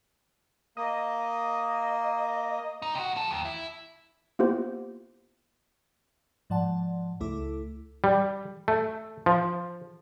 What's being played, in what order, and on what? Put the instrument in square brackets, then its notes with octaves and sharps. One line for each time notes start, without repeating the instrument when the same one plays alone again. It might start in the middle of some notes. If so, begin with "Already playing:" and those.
[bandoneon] A#3 [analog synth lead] D#5
[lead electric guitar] D#4
C3 F#4
F3 A4
D#2
E4
[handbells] A#3 B3 E4 F4 G4 C5
[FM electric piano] G#2 F3 D5 F#5 A5
C#2 A3 E4 A4 D6
[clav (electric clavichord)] G3
A3
F3